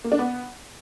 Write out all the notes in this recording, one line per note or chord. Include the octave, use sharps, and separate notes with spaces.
A#3
D4
B3